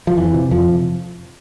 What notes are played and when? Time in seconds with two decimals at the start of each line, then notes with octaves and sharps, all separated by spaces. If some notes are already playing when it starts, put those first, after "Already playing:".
0.07 F3
0.17 F2 E3
0.34 C3
0.51 F2 F3
0.67 C3